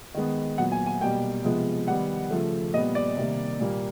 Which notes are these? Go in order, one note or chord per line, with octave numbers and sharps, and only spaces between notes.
D#3 G#3 B3
A#2 F#3 B3 F#5
G#5
G#5
B2 G3 A#3 G5
C3 F3 G#3 B3
D#3 G3 B3 F#5
C#3 F3 A3
A#2 G3 B3 D#5
D5
C3 D#3 G3 A#3
A#2 G3 A#3